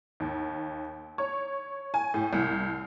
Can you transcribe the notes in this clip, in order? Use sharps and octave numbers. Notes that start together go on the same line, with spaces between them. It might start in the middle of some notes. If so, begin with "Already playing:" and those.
D#2
C#5
G#5
A2
C2